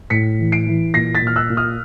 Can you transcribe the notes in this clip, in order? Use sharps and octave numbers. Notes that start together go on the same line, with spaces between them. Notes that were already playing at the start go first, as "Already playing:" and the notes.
A2 B6 C#7
E3
C7 D7
E3
A#2 A#6 C7
A6 B6
A#2 F6
E6 F#6
A#2
D#6 F6